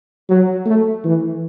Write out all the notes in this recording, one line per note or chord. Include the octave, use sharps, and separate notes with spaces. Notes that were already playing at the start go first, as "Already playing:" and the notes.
F#3
A3
E3